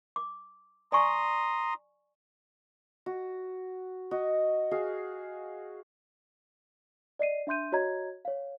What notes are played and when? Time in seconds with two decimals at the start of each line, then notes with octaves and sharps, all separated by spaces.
0.16 D6
0.92 D5 G#5 A#5 C6 C#6 D#6
3.06 F#4
4.11 F#4 D#5
4.71 F#4 G#4 F5
7.19 D5 D#5 C7 D#7
7.47 D4 E5 C6 G6 D#7
7.72 F#4 C#5 D#5 A#5 G#6
8.25 C#5 F5